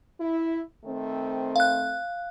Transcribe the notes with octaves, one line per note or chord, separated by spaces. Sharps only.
E4
D#3 A3 C4
F5 F#6